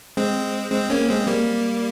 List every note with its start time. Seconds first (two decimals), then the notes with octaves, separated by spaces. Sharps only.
0.17 G#3 C4
0.72 G#3 C4
0.90 A#3 C#4
1.08 G#3 C4
1.27 G3 A#3